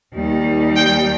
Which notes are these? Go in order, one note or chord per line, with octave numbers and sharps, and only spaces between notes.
D#2 D#3 G3
G5